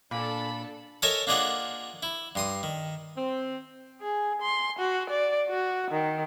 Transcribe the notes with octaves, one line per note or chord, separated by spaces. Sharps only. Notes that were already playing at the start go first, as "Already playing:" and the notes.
A#2 D4 A4 B5
A4 A#4 C#5 D#5 E5 G#5
A#3 D4 F4 G#4 D#5 F#5
E4
G2 C6 D#6
D#3
C4
G#4
C6
F#4
D5
F#4
D#3